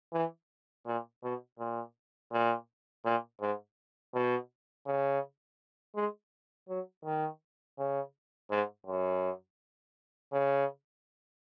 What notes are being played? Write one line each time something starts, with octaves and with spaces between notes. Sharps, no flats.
E3
A#2
B2
A#2
A#2
A#2
G#2
B2
C#3
G#3
F#3
D#3
C#3
G#2
F#2
C#3